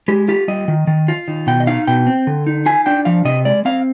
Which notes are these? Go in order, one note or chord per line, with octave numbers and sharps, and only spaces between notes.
G#3 G4
F4 G4
G3 D#5
D#3
D#3
F4
D#3
B2 G5
D#5
D#4 F5
B2 G5
C4
D3
D#4
F4 G#5
D4 G5
F3 F5
C3 D#5
G#3 D5
C4 F5